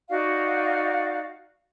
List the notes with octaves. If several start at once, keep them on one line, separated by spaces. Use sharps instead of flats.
D#4 F#4 D5 F5